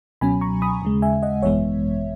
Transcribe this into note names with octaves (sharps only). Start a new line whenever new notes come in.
C#2 B2 F#3 C#4 G#5 B5
A#5 C#6
B5 D#6
D#2 C#3 G#3
E5 G#5
D#5 F#5
G#1 F#2 E3 G#3 B3 C#5 E5